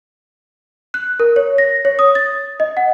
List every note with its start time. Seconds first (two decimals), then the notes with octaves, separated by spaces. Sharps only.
0.94 F#6
1.20 A#4
1.36 C#5
1.58 A#6
1.85 C#5
1.99 D#6
2.15 A6
2.60 D#5
2.77 F#5